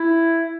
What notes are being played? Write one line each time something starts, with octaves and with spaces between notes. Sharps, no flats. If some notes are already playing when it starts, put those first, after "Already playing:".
Already playing: E4